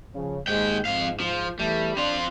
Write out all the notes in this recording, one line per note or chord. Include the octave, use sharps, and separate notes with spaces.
C#3 F3
D#2 G#2 G#3 G5
F2 G#2 F5
F3
E2 E3 G3 A3
C4 D4 F4